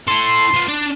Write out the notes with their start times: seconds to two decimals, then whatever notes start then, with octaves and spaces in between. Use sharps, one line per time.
0.08 E4 A4 C6
0.54 B3 F4
0.69 D4 D5